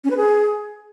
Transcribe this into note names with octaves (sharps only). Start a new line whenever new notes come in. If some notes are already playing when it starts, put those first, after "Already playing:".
C#4
B4
G#4